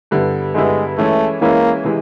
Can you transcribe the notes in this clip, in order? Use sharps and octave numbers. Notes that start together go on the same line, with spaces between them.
G2 D3 G3 B3 E4
G2 D3 G3 G#3 B3 E4
E3 G#3 A3 C#4 E4
E3 G#3 A#3 C#4 E4
C3 E3 G#3